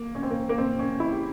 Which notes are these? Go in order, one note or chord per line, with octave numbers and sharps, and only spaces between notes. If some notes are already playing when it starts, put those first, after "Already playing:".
Already playing: A#3
C#4
C4
A#3
A#3
C4
C#4
E4
G4